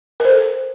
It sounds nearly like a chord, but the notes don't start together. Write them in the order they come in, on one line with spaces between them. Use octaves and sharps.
A#4 C5 A4